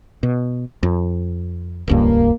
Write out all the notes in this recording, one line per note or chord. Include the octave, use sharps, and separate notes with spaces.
B2
F2
D#1 C#2 G2 A#3